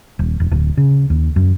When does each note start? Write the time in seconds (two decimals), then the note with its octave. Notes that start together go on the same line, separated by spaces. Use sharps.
0.19 D#1
0.40 E1
0.51 D1
0.77 C#3
1.10 D#2
1.36 F#2